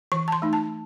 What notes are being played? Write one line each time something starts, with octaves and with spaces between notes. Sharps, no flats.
E3 C#6
A5
C6
A3 D#4
A5